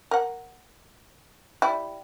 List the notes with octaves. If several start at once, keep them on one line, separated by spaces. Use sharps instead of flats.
A#4 F#5
G3 E4